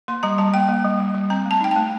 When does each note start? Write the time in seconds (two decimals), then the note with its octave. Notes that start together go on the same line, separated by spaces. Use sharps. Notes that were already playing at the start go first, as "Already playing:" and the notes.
0.08 A#3 C6
0.23 G3 A#5
0.38 G3 A5
0.54 A#3 G5
0.69 A#3
0.85 G3
1.00 G3
1.15 G3
1.30 C4 A#5
1.46 A3
1.51 A5
1.61 D#4 G5
1.71 A3 A5